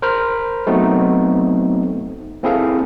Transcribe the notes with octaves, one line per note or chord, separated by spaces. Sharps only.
A#4 C5 B5 F6
F#3 A3 B3 C4 D#4 F#4
A#3 C4 E4 G#4 A4 F5